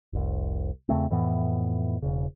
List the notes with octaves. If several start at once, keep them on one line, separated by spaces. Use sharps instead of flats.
F1 C2
E2 C#3 A3 C4
F2 A2 E3 B3
E1 C#3